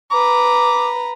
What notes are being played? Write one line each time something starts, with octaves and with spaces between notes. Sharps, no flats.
B4 A#5 D6